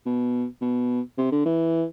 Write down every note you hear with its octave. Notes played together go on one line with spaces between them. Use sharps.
B2
B2
C3
D3
E3